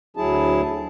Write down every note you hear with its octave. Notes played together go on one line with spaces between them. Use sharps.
D2 F#3 E4 G#4 A5